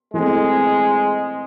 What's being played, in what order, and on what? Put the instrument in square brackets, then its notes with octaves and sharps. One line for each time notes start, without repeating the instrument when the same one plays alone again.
[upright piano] E3 A3 C4 [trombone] G#3